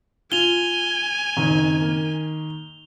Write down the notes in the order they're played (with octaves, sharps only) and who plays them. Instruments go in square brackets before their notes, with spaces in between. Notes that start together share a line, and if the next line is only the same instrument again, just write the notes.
[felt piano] F4 [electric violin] G#5 [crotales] F7 G7
[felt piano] F#1 C4 [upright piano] D#3
[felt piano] A#3